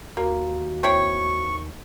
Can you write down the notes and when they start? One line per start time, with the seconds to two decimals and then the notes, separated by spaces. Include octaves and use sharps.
0.17 D#2 A#3 F#4
0.83 C4 E4 C#5 C#6